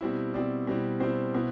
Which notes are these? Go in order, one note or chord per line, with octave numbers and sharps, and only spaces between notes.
B2 G3 C4 E4
B2 G3 C4 E4 D5
B2 G3 C4 E4
B2 G3 C4 E4 C5
B2 B3 E4